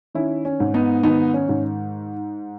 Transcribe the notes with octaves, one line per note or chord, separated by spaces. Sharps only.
D#3 C#4 E4
C#4
G#2
B3 D#4
D#3 B3 D#4
C#4
G#2